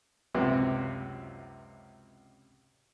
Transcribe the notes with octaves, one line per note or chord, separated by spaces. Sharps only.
C#2 F#2 C3 B3 C4